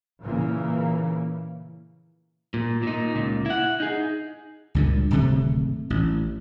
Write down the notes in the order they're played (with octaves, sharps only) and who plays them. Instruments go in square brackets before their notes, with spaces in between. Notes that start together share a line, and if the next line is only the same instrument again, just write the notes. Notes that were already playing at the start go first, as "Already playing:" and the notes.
[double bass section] A#2 C#3 E3 A#3
[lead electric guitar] A#2
A#2 D#4
C#2 A#2
E4 F#5
D#4 G#4
[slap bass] C#2 G2 A#2
D1 G#1 C3 A3
A1